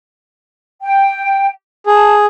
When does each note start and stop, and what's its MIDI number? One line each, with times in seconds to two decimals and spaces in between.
0.83 1.47 79
1.86 2.26 68
1.86 2.15 81